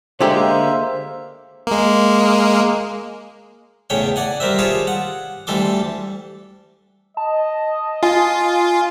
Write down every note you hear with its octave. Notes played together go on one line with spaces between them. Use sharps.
D3 G#3 A#3 G4 C5 E5
G#3 A#3
E2 A2 C#3 C#5 G5
D5 F#5 G#5
G3 A#4 C5 E5
F4 G4 G#4 C#5 A5
F#5
D2 E3 G3 A4 C6 D6
D#5 A5
F4 G#5